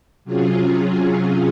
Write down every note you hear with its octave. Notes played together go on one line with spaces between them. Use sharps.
C3 F#3 C#4 F4 G#4